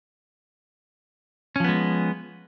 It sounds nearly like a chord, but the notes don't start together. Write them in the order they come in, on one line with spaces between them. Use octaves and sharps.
C#4 F3 B3 G#3